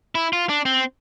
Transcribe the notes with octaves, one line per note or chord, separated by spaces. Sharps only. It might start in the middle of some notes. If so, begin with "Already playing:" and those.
E4
F4
D4
C4